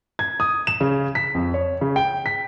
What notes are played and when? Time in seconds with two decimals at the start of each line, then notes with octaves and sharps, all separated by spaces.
0.19 G#6
0.40 D#6
0.67 E7
0.81 C#3
1.15 B6
1.35 F2
1.54 C#5
1.81 C#3
1.96 G5
2.26 B6